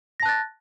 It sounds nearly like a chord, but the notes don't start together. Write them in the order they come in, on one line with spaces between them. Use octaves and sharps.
A#6 A5 F#6 A6